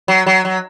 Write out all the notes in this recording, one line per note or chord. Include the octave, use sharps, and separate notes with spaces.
F#3
F#3
F#3